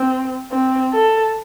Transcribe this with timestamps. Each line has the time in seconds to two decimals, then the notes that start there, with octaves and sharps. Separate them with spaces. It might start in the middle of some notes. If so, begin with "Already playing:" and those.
Already playing: C4
0.52 C4
0.93 A4